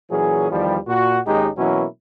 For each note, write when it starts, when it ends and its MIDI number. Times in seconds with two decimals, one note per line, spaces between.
0.11 0.49 46
0.11 0.49 52
0.11 0.49 54
0.11 0.49 61
0.11 0.49 68
0.51 0.77 40
0.51 0.77 51
0.51 0.77 53
0.51 0.77 55
0.88 1.19 46
0.88 1.19 66
1.27 1.49 32
1.27 1.49 39
1.27 1.49 56
1.27 1.49 61
1.27 1.49 63
1.27 1.49 67
1.57 1.85 47
1.57 1.85 52
1.57 1.85 54
1.57 1.85 58
1.57 1.85 61
1.57 1.85 64